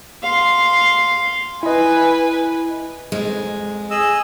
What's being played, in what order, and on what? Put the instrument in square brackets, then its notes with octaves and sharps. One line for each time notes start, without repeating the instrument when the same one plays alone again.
[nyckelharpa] F5 C6
[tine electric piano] E4 D#5 [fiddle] B4 G#5
[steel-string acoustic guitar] F2 G#3
[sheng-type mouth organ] G#4 D#5 E6